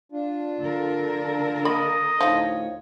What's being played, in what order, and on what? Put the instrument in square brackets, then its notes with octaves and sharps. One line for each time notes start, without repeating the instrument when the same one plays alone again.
[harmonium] D4 F4
[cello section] D3 A4 A#4
[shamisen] A#3 B5 [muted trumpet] D#5
[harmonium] D2 A2 C#5 [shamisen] F3 D#4